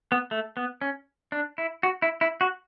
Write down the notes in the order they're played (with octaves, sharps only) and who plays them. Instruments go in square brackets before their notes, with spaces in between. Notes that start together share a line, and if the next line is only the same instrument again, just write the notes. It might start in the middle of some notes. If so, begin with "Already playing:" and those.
[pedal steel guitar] B3
A3
B3
C#4
D4
E4
F#4
E4
E4
F#4